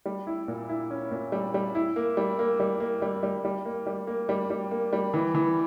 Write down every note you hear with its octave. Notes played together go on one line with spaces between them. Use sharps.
G3
E4
A#2
E4
C#4
A#2
G3
G3
E4
A#3
G3
A#3
G3
A#3
G3
G3
G3
A#3
G3
A#3
G3
G3
A#3
G3
E3
E3